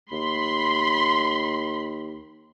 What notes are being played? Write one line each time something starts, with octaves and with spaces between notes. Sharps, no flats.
D#2 B5 C6